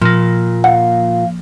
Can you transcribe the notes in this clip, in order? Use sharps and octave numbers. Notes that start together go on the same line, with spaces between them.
A#2 F3 A#3
F5 F#5